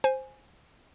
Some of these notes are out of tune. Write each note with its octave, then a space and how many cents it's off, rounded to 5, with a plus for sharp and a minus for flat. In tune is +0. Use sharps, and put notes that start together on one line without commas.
C5 +5 G#5 +0